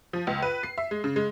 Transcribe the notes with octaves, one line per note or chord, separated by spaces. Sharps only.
F3
C#2
B4
C7
E5
G#3
C#3
G#3